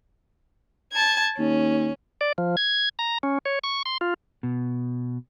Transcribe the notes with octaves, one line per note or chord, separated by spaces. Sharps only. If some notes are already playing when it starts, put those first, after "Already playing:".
A5 G#6
D#2 C#4
D5
F3
G#6
A#5
C#4
C#5
C#6
C6
F4
B2